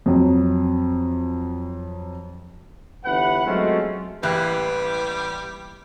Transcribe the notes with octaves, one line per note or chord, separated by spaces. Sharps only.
F2 F#3
G1 E3 B4 F#5
F#3 G#3 A3 C4 C#4 F4
A1 E3 G3 A#3 G4 B4 F#6